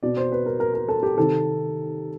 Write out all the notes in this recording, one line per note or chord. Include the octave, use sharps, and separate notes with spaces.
B2 D5
C5
B4
A#4
A#4
A#4
A4
G4
C3 D#3 A4